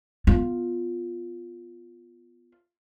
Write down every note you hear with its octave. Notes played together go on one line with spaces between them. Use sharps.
B3 F4